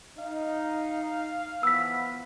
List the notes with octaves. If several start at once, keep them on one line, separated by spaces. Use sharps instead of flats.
D#4 F5
E3 F3 B3 E6 B6